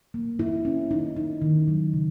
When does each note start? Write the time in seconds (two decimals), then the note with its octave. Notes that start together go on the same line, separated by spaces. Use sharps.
0.14 A#3
0.39 E4
0.65 C#4
0.91 D#4
1.16 D#4
1.42 D#3
1.68 F#3
1.93 C#3